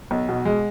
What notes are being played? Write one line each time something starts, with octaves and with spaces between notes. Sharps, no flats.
B1
B2
G#3